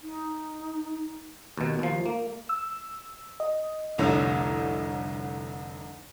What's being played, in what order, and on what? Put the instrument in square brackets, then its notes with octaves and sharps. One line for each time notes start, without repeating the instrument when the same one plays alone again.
[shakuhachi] D#4
[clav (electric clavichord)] D#2 B2
D#2 F3
A#3
[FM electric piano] E6
D#5
[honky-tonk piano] F1 C2 D3 D#4 C#5 E6